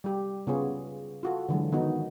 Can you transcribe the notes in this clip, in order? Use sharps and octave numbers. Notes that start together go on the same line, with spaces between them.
G3 G4
C#3 B3 F4 G#4 C#5
F4 F#4 A4
D3 E3 F#3 G#3
D#3 B3 D#4 F#4